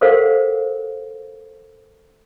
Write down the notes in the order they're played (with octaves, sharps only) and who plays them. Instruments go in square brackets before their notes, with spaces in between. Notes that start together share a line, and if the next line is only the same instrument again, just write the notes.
[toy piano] G4 A4 A#4 C5 F5 F#5